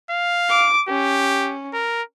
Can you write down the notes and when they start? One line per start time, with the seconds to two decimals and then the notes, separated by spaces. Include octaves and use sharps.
0.10 F5
0.49 D6
0.89 C#4 G4
1.73 A#4